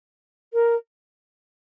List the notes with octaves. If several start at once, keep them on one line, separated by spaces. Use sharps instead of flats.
A#4